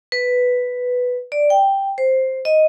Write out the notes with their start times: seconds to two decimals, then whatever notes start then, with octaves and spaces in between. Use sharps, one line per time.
0.12 B4
1.32 D5
1.50 G5
1.98 C5
2.45 D#5